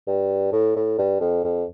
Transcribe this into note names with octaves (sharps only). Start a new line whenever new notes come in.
G2
A2
A2
G2
F2
F2